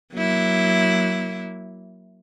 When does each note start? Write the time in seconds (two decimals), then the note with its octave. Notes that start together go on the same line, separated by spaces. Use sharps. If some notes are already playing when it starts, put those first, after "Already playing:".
0.13 F#3 A#3 E4